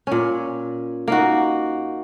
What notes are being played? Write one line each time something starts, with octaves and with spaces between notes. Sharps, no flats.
A#2 C#4
A#3 D#4 F#4